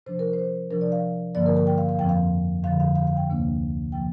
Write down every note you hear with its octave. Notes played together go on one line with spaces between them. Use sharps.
C3 F3 D4 C5
A#4
C5
C3 F3 D4 A#4
D5
F5
G2 D3 F3 A#3 D5
A#4
A#4
G5
F5
F5
F2 F3 C4 G5
F5
F2 D3 F3 F5
F5
F5
F5
G5
D2 C3 A#3 D4
C3 F3 A#3 G5